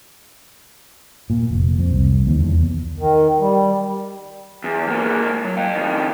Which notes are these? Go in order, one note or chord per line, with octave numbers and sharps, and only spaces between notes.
A#2
F1
F2
C2
D#2
E2
D#3
G3
E2
G#2 A#3
F#3
F5 G5
F2 D#3